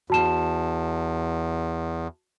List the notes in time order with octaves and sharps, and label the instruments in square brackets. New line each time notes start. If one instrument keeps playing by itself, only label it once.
[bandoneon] E2 [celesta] F#4 A5 E7